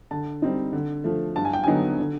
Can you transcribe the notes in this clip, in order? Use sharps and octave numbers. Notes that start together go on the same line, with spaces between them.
D3 A5
G3 C4 D#4
D3
F3 A3
G2 A5
G#5
G5
D3 F#3 B3 D#4 G#5
D3